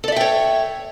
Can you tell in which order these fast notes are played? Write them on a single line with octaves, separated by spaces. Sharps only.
A4 D5 E5 G5 C#5